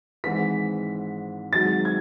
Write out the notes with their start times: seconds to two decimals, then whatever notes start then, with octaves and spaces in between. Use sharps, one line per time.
0.24 G#1 G#2 E3 B6
1.53 G#1 G#2 F#3 A6
1.85 G#6